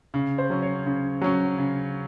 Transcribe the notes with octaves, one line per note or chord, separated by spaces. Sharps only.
C#3
C5
F#3 C#4
C#5
C#3
F#3 C#4
C#3